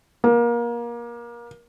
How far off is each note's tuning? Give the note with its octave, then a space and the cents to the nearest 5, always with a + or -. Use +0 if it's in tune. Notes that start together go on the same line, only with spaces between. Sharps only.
A#3 +25